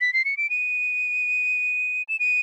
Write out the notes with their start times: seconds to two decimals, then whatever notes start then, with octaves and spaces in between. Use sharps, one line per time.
0.01 B6
0.13 C7
0.25 C#7
0.37 D7
0.50 D#7
2.09 E7
2.20 D#7